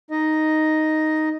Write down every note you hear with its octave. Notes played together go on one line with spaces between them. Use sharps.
D#4 D#5